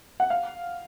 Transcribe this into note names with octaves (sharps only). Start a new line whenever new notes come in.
F#5
F5